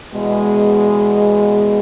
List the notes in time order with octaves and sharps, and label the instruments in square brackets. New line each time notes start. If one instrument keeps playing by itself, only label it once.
[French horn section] E2 B2 G#3